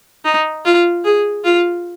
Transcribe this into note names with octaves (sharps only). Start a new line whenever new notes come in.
D#4
F4
G#4
F4